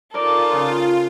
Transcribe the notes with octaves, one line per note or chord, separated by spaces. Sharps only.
D#4 F4 A4 A#4 D5 A6
C#3